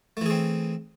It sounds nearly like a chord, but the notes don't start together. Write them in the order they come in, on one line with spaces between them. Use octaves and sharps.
A3 E3 G#4 C4